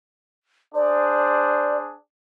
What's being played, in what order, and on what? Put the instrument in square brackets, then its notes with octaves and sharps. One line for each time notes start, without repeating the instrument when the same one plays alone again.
[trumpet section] D4 G#4 C5 [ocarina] D5